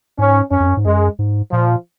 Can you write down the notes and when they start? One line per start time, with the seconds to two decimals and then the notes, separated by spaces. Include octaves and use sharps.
0.18 G#2 C#4
0.51 F#2 C#4
0.60 F2
0.68 F#2
0.77 G#2
0.85 F#2 G#3
1.19 G#2
1.52 A#2 F3